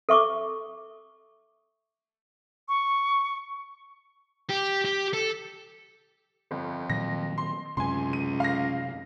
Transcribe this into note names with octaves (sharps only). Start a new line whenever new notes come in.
A4 E5 C#6 D6
C#6
G4
G4
A4
G1 F2
A#2 D#3 F#3 A#6
C6
C#2 F#2 C3 G#5 C6
D#7
F5 A#6